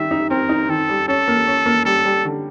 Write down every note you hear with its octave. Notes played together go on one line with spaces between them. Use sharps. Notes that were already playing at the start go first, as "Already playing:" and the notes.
Already playing: D#3 G3 E5
D#4
C4 A#4
D#4
D#3 A4
G3
C#4 A4
A#3
C#4
A#3
G3 A4
G3
D3